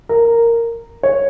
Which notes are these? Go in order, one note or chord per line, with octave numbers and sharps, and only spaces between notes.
A#4
C#5